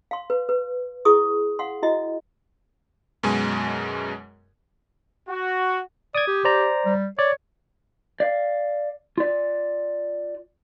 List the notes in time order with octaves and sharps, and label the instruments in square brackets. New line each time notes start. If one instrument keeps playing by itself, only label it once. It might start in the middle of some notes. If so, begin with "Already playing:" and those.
[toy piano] F5 C6
B4
B4
E4 G#4 C#6 D#6
F5 F#5 C6
E4 F#4 D#5
[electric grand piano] F#2 B2 G#3 G#5
[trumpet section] F#4
[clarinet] D5 [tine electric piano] D#6 G#6
[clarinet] G4
[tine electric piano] C5 D5 A#5
[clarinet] G3
[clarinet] C#5 [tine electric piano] D5
[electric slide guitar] D5 F5
F4 D5